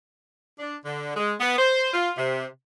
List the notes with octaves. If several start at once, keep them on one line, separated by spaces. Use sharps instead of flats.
D4
D3
G#3
B3
C5
F4
C3